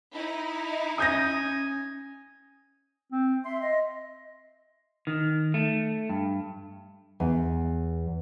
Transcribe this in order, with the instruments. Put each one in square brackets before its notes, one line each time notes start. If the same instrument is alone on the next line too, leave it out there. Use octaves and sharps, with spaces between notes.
[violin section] D#4 E4
[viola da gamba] C#4 [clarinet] G#5 [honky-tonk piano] D#6 G6 A#6
[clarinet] C4
[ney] E5 [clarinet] C6
[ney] D#5
[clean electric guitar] D#3
A3
G2
[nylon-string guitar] E2